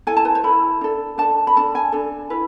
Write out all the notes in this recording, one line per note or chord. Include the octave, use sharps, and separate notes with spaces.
E4 A4 G#5
A5
B4
C5
E4 A4 B5
D4 A4
D4 A4 A5
B5
D4 A4 A5
G#5
D4 A4
E4 B4